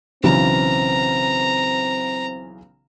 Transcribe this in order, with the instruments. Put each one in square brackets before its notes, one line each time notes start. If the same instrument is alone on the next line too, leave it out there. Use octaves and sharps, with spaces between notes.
[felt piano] B1 C#3 E3 [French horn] C4 [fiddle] A#5